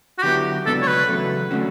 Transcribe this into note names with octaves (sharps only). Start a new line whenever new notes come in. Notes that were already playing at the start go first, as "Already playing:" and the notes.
F#4
D3 F#3 B3 E4 G4
C#2 B2 F#3 B3 D4 A4
C#5
B4
E2 C#3 F#3 A3
D3 A3 C#4 F#4